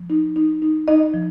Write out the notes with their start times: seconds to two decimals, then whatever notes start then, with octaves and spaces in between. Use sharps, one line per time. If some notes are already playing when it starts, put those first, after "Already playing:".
Already playing: F3
0.10 D#4
0.36 D#4
0.62 D#4
0.88 D#4 D#5
1.14 F3